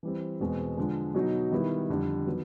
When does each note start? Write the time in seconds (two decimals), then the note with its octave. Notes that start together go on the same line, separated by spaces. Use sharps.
0.03 E3 G3 C4
0.40 E2 B2 G#3 C4
0.77 D3 F3 G#3
1.14 B2 F#3 B3 D#4
1.52 D#3 G3 B3 E4
1.89 F2 D3 G3
2.26 D#3 F#3 B3